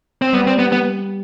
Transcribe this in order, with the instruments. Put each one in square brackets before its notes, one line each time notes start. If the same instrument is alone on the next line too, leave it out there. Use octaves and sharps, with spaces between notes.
[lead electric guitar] C4
[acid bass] G3 [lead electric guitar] B3
[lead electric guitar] C4
B3
B3